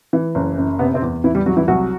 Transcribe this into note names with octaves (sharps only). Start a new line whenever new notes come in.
E3
F#1
F#2
C3 B3
C3 C4
E2
E2 E3 E4
G3 G4
F#3 G3 F#4
E3 E4
C2 F#3 F#4